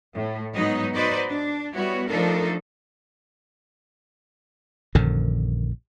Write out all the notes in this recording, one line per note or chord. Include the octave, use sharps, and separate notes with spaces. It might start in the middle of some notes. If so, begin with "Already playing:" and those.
A2
G#2 F#3 B3 D#4 D#5
D#4 F#4 B4 C5 D5 D#5
D4
G3 B3 E4 F#4 C#5
F3 A3 D4 D#4 A4 A#4
A#1 F#2 D3 D#3